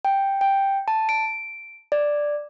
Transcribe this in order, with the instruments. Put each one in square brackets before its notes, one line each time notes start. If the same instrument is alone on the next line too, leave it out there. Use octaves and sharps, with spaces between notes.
[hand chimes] G5
G5
A5
D7
D5